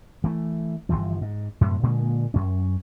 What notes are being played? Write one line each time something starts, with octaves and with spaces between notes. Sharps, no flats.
E3 A3
G1 D2 E3 F3
G#2
F#2 A2 C3
A#2 D3 G#3 A#3
F#2 C#4